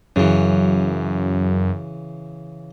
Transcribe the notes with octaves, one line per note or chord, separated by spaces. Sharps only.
F#2 C#3 E3